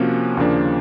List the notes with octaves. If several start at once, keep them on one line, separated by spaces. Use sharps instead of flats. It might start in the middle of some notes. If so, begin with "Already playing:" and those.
Already playing: C3 F3 A#3 C#4 F#4
D#2 C#3 F3 A#3 D4